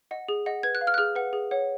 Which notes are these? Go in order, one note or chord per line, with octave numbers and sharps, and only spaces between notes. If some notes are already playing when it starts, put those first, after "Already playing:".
D#5 F#5
G#4
D#5 F#5
B4 G#6
F#6
F5
F6
F#6
G#4 F6
B4 F#5
G#4
C#5 F#5